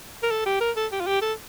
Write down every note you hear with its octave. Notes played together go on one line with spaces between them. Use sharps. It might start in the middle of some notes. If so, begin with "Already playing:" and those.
A#4
A4
G4
A#4
A4
G4
F4
G4
A4